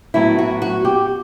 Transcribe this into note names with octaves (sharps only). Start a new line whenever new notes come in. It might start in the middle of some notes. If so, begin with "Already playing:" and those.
A2 F#3 B3 E4
F#4
F#4
G4